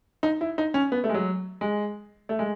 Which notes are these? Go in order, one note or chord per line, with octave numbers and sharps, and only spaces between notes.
D#4
E4
D#4
C#4
B3
A3
G#3
F#3
G#3
A3
G#3